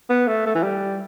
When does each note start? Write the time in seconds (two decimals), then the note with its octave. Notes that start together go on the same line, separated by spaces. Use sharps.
0.10 B3
0.28 A3
0.46 A3
0.55 E3
0.63 G3